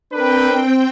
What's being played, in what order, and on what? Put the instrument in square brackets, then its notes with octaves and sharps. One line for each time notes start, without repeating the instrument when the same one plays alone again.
[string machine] C4 G5 [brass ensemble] D4 A#4 B4